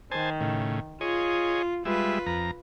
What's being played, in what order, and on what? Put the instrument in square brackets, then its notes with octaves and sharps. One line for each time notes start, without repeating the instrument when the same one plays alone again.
[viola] D#3 [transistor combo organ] C5 G#5 A5
[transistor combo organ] A2 C#3
[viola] F4 [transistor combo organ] G#4 C#5 D#5
[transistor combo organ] G3 G#3 E5 [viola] F4 B4
[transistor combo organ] F2 A#5